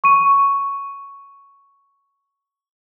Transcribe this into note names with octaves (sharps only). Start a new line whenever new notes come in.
C#6 D#7